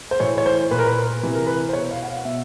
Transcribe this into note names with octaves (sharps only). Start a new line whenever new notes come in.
C5
A2 E3 C#5
C#5
C5
A#2 B4
A#4
B4
C3 E3 B4
A#4
B4
C5
B2 C#5
F5
F#5
F5
B2 E5